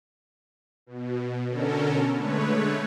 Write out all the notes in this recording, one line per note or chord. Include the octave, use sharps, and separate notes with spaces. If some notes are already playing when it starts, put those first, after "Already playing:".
B2
B2 D3 C#4 A4 A#4
D3 G#3 A3 B4 C#5